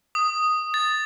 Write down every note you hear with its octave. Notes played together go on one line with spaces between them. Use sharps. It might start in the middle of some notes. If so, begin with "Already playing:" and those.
D#6
A6